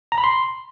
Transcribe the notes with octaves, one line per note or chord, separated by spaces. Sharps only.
A#5
B5
C6